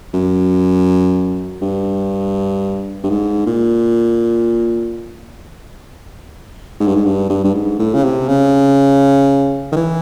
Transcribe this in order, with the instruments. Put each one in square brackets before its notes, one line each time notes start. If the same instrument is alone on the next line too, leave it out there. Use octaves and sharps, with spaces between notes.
[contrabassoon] F#2
G2
G2
G#2
A#2
G#2
G2
G#2
G2
G2
G2
G#2
A2
C#3
C3
C#3
D#3
E3